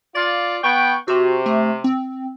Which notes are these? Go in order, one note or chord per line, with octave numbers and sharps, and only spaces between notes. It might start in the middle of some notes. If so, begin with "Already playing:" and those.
F4 D5 A6
B3 G5 C#6
C3 F#4
A3
C4